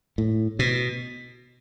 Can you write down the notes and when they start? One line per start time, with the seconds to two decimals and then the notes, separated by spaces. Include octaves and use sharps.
0.18 A2
0.59 B2